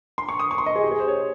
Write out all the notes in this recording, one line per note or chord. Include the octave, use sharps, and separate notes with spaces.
C6
C#6
D#6
C#6
C6
D#5
G#4
G4
G#4
C5
C#5